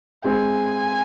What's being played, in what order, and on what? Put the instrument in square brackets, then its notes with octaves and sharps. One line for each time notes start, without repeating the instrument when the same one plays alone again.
[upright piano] G#3 C4 [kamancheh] G#5